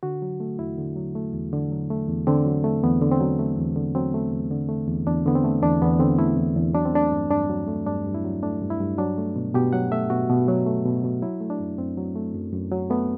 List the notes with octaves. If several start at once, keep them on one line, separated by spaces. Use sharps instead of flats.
D3 F#4
F#3
A3
E2 E4
D3
F#3
A3
E2
D3
F#3
A3
E2
D3 C4
F#3
A3
E2 B3
D3
C4
F#3
A3
E2
D3
F#3 C4
A3
E2
D3
A3
E2
E2 D4
D3 B3
C4
A3
E2 D4
E2 B3
D3 C4
A3 E4
E2
E2
F#3 D4
C4
A3 D4
G2
G2 D4
F#3
A3
G2 D4
G2
E4
F#3
A3 D4
G2
E4
G2
F#3 D4
A3
B2
B2 G4
F#3 F#5
A3 E5
B2 F#4
B2
F#3
A3
B2
B2
F#3 E4
A3
D4
F#2
F#2 C4
F#3
A3
F#2
F#2
F#3
A3 B3